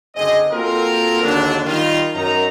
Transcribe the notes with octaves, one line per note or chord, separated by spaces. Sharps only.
F#1 D3 C4 G#4 D#5
A#3 C4 F4 F#4 A4 A#4
D#2 D3 F#3 G#3 D4
D#3 G3 D#4 F4
F#2 D#4 A#4 A#5